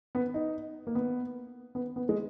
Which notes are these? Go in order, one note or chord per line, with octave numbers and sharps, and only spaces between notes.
B3
D#4
A#3
B3
B3
B3
G#3